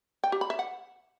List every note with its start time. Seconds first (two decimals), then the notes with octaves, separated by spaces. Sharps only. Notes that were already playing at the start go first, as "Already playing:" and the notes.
0.24 G5
0.32 G4
0.41 B5
0.50 E5
0.59 F#5